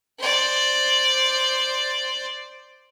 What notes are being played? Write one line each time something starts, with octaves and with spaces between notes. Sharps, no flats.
C5 D5